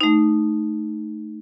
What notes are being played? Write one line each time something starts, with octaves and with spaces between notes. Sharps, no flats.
A3 D#4